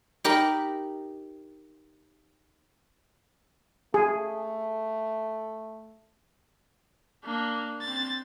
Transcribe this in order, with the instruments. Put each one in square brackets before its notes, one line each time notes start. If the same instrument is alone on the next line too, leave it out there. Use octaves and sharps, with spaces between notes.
[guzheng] D#4 G4 A#4 B5
[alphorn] A3 [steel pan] G#4
[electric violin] A#3 D4
C4 A6